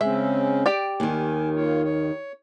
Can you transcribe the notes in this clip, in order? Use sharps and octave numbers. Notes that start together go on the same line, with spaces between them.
C#3 G#3 C4 C#4 E5
G4 D5
D#2 D#3 G#5
A#3 F4 C#5
C#5